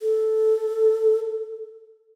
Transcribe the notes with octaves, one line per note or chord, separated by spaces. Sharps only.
A4